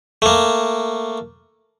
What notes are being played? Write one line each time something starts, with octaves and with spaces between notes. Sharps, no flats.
A3 A#3